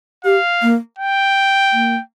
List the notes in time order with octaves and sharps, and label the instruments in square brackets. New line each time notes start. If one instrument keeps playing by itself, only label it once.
[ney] G4 [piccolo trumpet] F5
[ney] A#3
[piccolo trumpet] G5
[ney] A#3